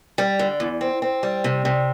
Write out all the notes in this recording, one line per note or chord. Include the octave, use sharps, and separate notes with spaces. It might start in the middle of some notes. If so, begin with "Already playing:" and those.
G3
D3
E2
C4
C4
G3
C3
C3